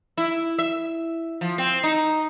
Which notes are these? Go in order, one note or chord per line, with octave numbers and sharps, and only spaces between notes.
E4
E5
F3
C4
D#4